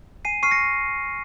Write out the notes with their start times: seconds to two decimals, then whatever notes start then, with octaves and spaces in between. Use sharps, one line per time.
0.25 G#5 C7 D#7
0.43 C#6 F6 C7 D#7
0.51 A#6 C#7